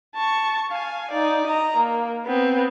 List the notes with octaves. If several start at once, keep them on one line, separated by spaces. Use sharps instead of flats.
A5 C#6
F5 G#5
D#4 D5
D#5 A#5
A#3
B3 C4